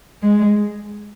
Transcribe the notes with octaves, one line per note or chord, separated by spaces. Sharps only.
G#3